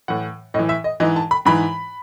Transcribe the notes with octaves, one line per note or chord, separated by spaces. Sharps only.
A2 E3 F#5
A2 E3 D#5
E5
D#5
G#2 E3 D#5
A5
B5
G#2 E3 B5